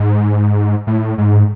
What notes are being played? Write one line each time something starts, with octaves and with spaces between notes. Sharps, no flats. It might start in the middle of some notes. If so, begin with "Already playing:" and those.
Already playing: G#2
A2
G#2